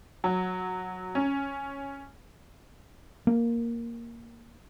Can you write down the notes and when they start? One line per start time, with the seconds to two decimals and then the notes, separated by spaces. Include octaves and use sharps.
0.24 F#3
1.15 C#4
3.27 A#3